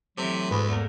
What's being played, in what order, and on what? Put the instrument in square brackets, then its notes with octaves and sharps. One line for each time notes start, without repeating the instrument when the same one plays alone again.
[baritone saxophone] C3 [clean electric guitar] E3 A3 [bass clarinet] F#3
[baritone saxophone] D2 [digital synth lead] G#2 [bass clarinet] B4
[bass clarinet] E2 [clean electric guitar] A3 A#3 A#4